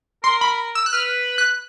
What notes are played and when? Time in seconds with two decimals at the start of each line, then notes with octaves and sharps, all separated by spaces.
0.23 A#4 C6
0.41 B5
0.75 E6
0.86 F#6
0.93 B4 F6
1.38 F#6